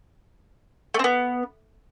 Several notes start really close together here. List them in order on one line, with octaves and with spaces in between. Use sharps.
A3 C4 B3